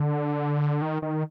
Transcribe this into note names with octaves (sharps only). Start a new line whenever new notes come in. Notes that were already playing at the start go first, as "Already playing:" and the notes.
Already playing: D3
D#3
D#3